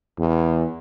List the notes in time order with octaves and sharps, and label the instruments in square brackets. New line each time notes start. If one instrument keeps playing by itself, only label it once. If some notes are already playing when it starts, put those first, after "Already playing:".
[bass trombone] E2